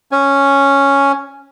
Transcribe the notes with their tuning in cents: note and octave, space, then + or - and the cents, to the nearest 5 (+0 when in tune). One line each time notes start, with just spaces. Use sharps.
C#4 +0 G#5 +0